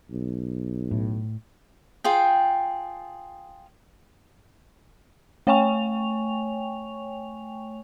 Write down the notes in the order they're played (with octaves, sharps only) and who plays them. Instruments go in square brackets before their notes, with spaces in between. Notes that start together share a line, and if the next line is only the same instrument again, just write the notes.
[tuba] B1
[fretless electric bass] A2
[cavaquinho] F4 G#4 G5
[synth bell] A3 C#5 G5 G#5 C#6 F7